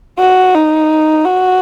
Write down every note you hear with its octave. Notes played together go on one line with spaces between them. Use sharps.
F#4
D#4
F#4